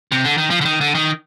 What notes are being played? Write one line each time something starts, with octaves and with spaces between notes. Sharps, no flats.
C3
D3
D#3
F3
D3
D#3
D3
D#3